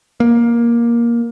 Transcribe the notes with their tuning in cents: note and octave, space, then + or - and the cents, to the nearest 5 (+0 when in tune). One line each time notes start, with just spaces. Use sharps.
A#3 +15